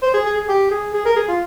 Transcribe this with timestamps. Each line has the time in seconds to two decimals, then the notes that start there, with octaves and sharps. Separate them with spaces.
0.02 C5
0.14 G#4
0.25 G#4
0.37 G#4
0.49 G4
0.71 G#4
0.94 G#4
1.05 A#4
1.16 G#4
1.28 F4